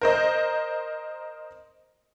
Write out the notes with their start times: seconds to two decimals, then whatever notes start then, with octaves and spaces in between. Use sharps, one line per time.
0.01 A#4 C5 D#5